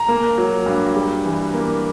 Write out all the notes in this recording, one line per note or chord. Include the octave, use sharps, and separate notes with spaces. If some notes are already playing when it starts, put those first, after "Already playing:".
Already playing: A#5
A#3
F#3
G2
G3
E3
A#3